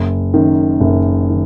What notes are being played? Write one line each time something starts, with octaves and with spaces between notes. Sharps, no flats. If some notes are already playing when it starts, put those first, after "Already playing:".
Already playing: F#1
F#2 D#3
F#1
D#3